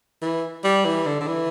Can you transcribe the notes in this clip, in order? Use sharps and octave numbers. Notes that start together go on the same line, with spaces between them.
E3
G3
E3
D3
D3
E3